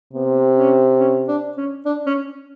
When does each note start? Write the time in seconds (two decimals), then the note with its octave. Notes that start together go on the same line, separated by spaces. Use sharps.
0.13 C3 B3
0.57 C#4
0.99 C#4
1.28 D4
1.57 C#4
1.85 D4
2.06 C#4